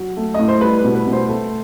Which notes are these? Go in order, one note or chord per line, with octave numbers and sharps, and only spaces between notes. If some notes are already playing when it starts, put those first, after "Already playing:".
Already playing: F#3
A3
A2 D#5
C5
G3 B4
B4
B2
B4
B2
C5
A3